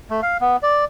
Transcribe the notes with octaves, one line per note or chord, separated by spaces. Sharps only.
A3
F5
B3
D5